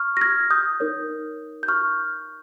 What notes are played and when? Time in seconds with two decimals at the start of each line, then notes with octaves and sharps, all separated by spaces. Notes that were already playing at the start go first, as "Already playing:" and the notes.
Already playing: C#6 F6
0.17 A#6
0.21 F6 G#6
0.51 D#6 G6
0.80 D#4 A#4 C#5
1.63 G6
1.68 C#6 F6